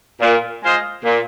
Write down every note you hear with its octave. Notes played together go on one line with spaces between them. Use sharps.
A#2
G#3 F4 C5 D#5
A#2